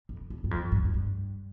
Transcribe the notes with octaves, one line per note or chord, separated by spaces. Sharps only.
F2
E2
G2
F2
G2
F2
G2